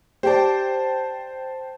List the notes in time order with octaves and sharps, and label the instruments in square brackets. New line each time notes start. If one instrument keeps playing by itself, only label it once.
[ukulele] G4 D5 [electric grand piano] C5 G5 A5